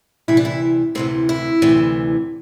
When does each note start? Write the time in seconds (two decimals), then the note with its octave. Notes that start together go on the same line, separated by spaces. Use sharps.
0.28 D2 C3 E3 E4
0.37 D4
0.45 E4
0.95 D2 C3 E3 C4
1.29 E4
1.62 D2 C3 E3